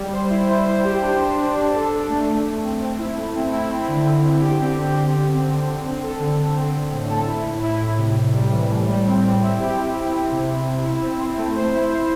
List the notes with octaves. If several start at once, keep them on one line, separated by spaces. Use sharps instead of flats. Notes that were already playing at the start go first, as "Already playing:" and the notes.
Already playing: G3
C5
E4
C5
C5
G4
D4
C5
D4
D4
A4
D4
A3
A3
A3
C4
C4
E4
A3
C4
E4
C4
D3
D3
D3
G4
C4
C4
G4
D3
C4
D3
D3
C4
A4
D3
D3
C4
C4
A2
A4
E4
A2
E4
A2
C3
C3
G3
E3
A2
G3
C4
C4
E4
G4
E4
E4
C4
C3
C3
C3
E4
C4
C4
A3
C5
E4
E4